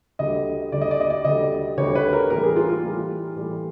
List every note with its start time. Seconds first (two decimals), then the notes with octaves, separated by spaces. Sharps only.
0.19 D2 D3 G3 D#5
0.72 D2 D3 G3 D5
0.81 D#5
0.91 D5
1.00 D#5
1.10 D5
1.25 D2 D3 G3 D#5
1.77 D2 D3 G3 C#5
1.95 B4
2.13 A#4
2.30 A2 E3 G3 A#4
2.43 G#4
2.56 F4
2.70 F4
2.83 A2 E3 G3
3.36 A2 E3 G3